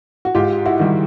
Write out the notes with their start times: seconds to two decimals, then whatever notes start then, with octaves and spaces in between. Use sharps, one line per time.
0.25 F#4
0.35 G#2 F4 G4
0.65 E4 F#4
0.79 D#3 G3